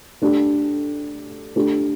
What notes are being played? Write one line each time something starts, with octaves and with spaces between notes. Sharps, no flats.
A3 D4 G4
A3 D4 G4